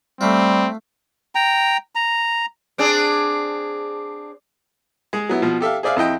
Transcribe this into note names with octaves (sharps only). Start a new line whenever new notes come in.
G3 A3 C4 F4
G5 A#5
A#5
C4 D4 G#4
G#3 G#4
F#3 B3 E4
B2 F3
G4 A4 E5 F5
G#4 C5 D5 E5 F5
F2 E4 D#5 G5